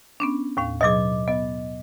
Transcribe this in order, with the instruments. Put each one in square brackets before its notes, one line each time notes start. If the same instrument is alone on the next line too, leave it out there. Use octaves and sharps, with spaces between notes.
[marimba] B3 C#4 D4
D#2 A2 F5
[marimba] B2 F#3 G#4 [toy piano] D#5 D6
[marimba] B3 [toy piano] D#5